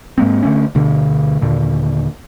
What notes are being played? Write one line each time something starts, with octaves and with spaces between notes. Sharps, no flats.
G#2 G#3 A#3 C4
D3 E3 A3 C#4
D2 B2 D3
D#2 A#2 D3